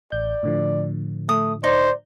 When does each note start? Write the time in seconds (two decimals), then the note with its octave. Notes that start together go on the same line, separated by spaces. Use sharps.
0.12 A1 D5 G6
0.43 A2 D3 F3
1.29 A3 D#6
1.64 D#4 C5 D5